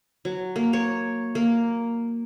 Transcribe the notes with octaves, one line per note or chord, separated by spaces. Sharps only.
F#3
A#3
C#5
A#3